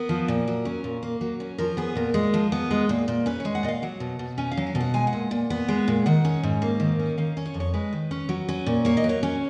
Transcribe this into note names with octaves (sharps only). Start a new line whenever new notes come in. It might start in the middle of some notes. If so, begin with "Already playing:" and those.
Already playing: B3 A#4
F3
A#2
F#3
C#4
A#2
A#3
F#3
C#4
F3 A#4
B3 G#4
A#2 A#4
G#3
F3
B3
G#3
A#2
A#2
C#4 B4
G#3 C#5
F#5
A#2 D#5
F5
F#3 F#5
B2
B2
C#4 G#5
F5
F#3
G#5
B2
F#5
G#3 G#5
F#5
A#2
A#2
B3
G#3
A#2
D#3 F#5
C#4
G#2
A#3
D#3
C#4
D#3 F5
C#4
C#5
F2
C#5
G#3 B4
D#3
C#4
F#3
C#4
A#2
A#3 C#5
D#5
F#3
C#5
C#4